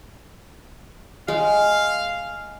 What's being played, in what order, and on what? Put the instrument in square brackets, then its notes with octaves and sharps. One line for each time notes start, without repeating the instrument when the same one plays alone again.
[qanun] G#3 [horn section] F5